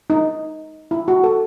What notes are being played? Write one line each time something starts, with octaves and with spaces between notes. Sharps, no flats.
D#4
E4
F#4
A4